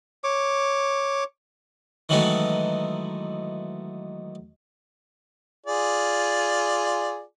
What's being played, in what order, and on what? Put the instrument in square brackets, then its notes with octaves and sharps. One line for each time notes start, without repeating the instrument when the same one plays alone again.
[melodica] C#5 D6
[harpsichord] D#3 E3 F#3 G#3 A3 B3
[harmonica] F4 G#4 D5